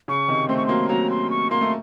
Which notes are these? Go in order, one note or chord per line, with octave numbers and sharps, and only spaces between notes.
C#3 C#6
C3 D#3
A3 C4 C6
C#6
F#3 A#3 C6
F#3 A#3 A#5
C6
C#6
A#3 C6
A3